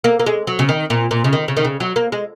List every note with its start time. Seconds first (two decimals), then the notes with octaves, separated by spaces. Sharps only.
0.04 A#3
0.19 A#3
0.26 G#3
0.47 F#3
0.59 C#3
0.69 D#3
0.90 A#2
1.11 A#2
1.24 C#3
1.33 D#3
1.48 C#3
1.57 D#3
1.65 C#3
1.80 F#3
1.96 A#3
2.12 G#3